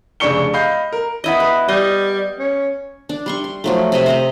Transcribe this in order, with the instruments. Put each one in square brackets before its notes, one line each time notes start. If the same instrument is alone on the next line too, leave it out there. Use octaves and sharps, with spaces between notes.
[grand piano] F1 C#3 D4 C#6 C#7 G7
D#5 F5 B5 G6 C7
A#4
[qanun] B3 E4 D#5
B4
[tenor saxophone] G3 [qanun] D#5
[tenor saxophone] C#4
[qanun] D4
G3 C6 C#6
C6
F3 F#3 A3
C3 D#5 E5
C5 D#5 A#5